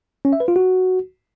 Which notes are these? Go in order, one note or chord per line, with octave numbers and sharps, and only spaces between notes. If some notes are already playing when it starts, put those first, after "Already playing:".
C#4
E5
B4
F4
F#4